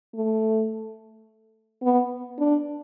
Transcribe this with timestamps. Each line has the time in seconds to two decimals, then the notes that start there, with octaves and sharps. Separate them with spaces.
0.15 A3
1.82 B3
2.39 D4